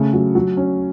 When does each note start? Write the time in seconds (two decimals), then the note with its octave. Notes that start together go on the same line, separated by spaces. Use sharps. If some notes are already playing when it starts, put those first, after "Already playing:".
Already playing: C#3 A3
0.13 F#3
0.35 F#3
0.57 C#4